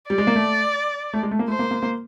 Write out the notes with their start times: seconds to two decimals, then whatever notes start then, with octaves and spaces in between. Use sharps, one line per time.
0.10 G3 D5
0.18 G#3
0.27 A#3
0.36 A3
1.13 A3
1.23 G#3
1.31 A3
1.39 A#3
1.48 A3 C5
1.59 A#3
1.71 A#3
1.83 A#3